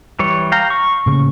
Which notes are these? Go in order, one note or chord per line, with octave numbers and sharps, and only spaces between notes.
E3 G3 C#5
F5 G5 A#5
C#6
A2 C#3 A#3